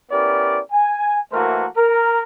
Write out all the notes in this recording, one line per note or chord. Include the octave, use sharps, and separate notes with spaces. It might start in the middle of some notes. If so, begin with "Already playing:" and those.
B3 C#4 E4 G4 A#4 D5
G#5
E3 A3 A#3 F#4 A#4 C5
A#4